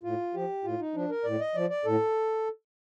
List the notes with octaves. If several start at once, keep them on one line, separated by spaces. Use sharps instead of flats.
A2 F4
F3 G4
A2 F4
D#4
F3 D4
A#4
A2 D5
D#5
F3 D5
D5
A2 A4